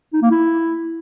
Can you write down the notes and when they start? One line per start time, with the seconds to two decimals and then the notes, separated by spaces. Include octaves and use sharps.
0.13 D#4
0.22 A#3
0.31 E4